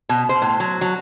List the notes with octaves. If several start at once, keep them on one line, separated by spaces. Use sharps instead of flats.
B2
C5
A2
F#3
F#3